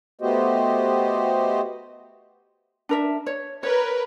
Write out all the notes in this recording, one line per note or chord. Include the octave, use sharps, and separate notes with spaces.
A3 B3 F#4 G4 C5 D#5
D4 A#4 E5
C#5
A#4 B4 C#5